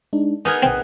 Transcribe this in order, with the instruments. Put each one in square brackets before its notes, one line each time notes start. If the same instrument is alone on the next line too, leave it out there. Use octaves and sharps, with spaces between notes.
[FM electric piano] G#3 D4 D#4
[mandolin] B3 [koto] D#4 G#4 A#4 [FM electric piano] D#6 F6 G#6
[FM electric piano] A#1 G#5 [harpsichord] C4